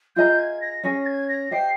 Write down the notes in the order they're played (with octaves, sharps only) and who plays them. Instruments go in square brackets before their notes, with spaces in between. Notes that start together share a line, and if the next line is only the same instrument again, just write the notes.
[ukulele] F4 G#4 D#5 A#5 [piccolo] G6
[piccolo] G#6
A#6
[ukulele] C#4 G#4 C#5 G#5 [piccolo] A#6
[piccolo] G#6
A#6
[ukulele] G4 C5 D#5 G5 [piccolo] C7